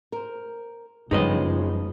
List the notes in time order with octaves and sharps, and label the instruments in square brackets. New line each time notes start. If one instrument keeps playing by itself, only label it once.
[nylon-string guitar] A#4 C5
[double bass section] F#1 F3 [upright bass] G2 [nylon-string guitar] C#3 G#3 [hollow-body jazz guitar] D#4 B4 D#5